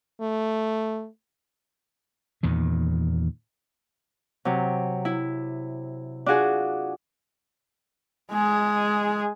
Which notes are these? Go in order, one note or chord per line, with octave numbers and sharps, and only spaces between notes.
A3
E2 A#2 D#3
C3 F#3
E4
D4 F4 F#4 G#4
G#3 G#4